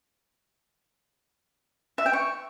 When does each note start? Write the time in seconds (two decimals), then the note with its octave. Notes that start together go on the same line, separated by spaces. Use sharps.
1.98 E5
2.06 G5
2.13 C#6